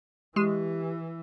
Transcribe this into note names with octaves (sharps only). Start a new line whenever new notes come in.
E3 G#3 G4